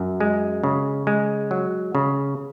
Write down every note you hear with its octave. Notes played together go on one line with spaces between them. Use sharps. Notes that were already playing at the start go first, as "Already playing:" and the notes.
Already playing: F#2
G#3
C#3
G#3
F#3
C#3